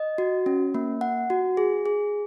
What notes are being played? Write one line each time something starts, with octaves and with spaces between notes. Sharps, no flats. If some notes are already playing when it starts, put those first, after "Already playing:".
Already playing: D#5
F#4
C#4
A#3
F#5
F#4
G#4
G#4